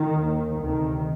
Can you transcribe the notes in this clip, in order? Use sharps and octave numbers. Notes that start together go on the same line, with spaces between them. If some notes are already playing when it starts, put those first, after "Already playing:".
Already playing: D#3
D#2
D2 C3 D#3